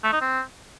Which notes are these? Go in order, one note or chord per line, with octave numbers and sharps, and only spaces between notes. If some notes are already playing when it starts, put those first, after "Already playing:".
A3
D#4
C4